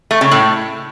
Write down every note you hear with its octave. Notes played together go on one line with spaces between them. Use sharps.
A3
C#3
A2